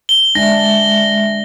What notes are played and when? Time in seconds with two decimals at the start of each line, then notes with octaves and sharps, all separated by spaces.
0.09 G7
0.35 G#3 D4 E5 A#6